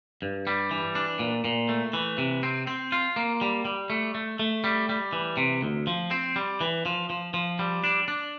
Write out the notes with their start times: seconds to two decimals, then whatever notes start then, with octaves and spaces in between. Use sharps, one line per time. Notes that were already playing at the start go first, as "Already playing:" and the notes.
0.22 G2
0.47 G3
0.71 E3
0.95 D4
1.19 A#2
1.44 A#2
1.69 A3
1.93 E3
2.18 C3
2.43 C4
2.67 C4
2.92 F4
3.16 A#3
3.41 G3
3.65 G3
3.90 A3
4.15 A3
4.39 A3
4.64 G3
4.89 G3
5.13 E3
5.37 C3
5.62 D2
5.87 F3
6.11 C4
6.36 G3
6.61 E3
6.86 F3
7.10 F3
7.34 F3
7.59 G3
7.84 D4
8.08 D4